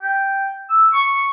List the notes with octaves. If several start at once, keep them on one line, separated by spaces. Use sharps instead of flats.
G5
E6
C#6